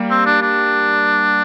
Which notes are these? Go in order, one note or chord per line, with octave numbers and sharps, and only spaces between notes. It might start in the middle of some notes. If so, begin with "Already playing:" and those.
Already playing: G3 A#3
C4
D4
D4